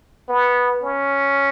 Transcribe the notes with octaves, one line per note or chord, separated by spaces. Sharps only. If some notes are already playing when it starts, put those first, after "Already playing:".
B3
C#4